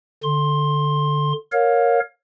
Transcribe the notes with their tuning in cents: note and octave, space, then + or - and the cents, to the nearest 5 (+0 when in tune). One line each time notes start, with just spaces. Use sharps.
D3 +0 C6 +15
A#4 +0 C#5 +0 F5 +30